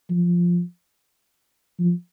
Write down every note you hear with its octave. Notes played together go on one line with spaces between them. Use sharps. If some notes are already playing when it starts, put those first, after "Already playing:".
F3
F3